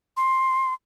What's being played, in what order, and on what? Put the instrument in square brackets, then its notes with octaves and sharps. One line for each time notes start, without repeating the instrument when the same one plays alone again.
[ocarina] C6